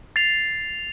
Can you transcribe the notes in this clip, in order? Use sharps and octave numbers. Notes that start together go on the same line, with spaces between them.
A6 C7 F7